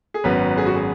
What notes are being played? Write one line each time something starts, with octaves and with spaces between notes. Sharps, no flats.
G#4
G#1 F#2 F#3 B3 B4
G#4
F#4
G#4